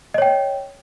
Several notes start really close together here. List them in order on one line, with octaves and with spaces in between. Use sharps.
D#5 C#5 G5